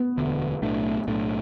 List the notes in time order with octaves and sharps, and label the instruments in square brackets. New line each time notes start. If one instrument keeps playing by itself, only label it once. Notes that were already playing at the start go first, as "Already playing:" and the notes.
Already playing: [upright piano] B3
[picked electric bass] E1 D2 D3
B1 A2 A3 D4
B1 A2 A3 D4